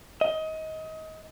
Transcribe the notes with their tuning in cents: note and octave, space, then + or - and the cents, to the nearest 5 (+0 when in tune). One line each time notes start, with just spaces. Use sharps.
D#5 +25